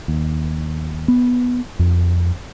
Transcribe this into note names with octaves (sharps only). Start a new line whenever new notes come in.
D#2
B3
F2